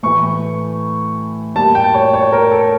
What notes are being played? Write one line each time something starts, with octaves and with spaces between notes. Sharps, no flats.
A2 E3 A3 C#6
A2 G3 A#3 A5
G5
C#5
C#5
A#4
A4